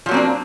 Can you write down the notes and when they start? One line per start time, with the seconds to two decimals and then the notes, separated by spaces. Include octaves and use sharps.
0.06 F3
0.09 F#3
0.11 A#3
0.14 C4
0.17 D4